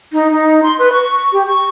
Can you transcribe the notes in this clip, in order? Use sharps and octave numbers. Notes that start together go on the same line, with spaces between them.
D#4
D#4
C6
B4
C#6
G4
C#6